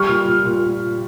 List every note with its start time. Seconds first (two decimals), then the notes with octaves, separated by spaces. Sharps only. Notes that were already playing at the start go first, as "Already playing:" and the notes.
Already playing: G3 C#6 F6
0.08 A#2
0.27 A#2
0.45 A#2
0.64 A#2